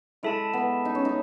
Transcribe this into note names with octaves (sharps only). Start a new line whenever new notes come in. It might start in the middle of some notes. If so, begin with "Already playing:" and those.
G#3 E4 A4 E5 A5
B3
D#4
C#4
D#4